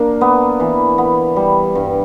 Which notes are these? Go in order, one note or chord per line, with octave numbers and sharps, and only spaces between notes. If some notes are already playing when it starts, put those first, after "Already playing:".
Already playing: A#3 D4
B3
E3
B3
G3
G2